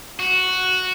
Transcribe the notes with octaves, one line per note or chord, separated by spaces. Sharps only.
F#4